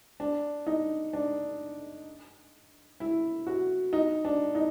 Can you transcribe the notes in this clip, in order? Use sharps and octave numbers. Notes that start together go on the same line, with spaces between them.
D4
D#4
D4
E4
F#4
D#4
D4
D#4